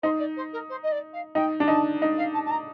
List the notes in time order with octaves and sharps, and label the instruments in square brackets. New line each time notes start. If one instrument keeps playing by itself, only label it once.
[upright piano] D#4 [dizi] C5
[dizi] D5
C5
A#4
C5
D#5
D5
F5
[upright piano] D#4 [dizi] G5
[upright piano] D4
[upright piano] D#4 [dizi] A5
[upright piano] D#4
[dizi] F5
A5
A5
A#5